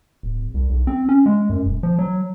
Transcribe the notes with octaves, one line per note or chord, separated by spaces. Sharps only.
D1
C2
B1
C4
C#4
G#3
F#2
D#1
F3
F#3